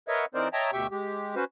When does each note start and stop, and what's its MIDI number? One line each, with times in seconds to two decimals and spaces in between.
0.08 0.25 70
0.08 0.25 71
0.08 0.25 73
0.08 0.25 75
0.08 0.25 76
0.08 0.25 78
0.34 0.48 52
0.34 0.48 60
0.34 0.48 63
0.34 0.48 70
0.34 0.48 72
0.34 0.48 74
0.53 0.71 73
0.53 0.71 75
0.53 0.71 76
0.53 0.71 79
0.53 0.71 81
0.53 0.71 82
0.73 0.87 38
0.73 0.87 47
0.73 0.87 67
0.73 0.87 76
0.73 0.87 79
0.73 0.87 85
0.92 1.35 56
0.92 1.35 67
1.36 1.44 61
1.36 1.44 66
1.36 1.44 71
1.36 1.44 72